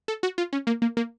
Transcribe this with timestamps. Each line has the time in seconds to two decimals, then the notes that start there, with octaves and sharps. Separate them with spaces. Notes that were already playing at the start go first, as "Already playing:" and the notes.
0.08 A4
0.23 F#4
0.38 F4
0.53 C#4
0.67 A#3
0.82 A#3
0.97 A#3